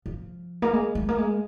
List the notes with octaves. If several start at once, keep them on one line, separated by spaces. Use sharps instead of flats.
F3
A#3
G#3
G#3
A#3
G#3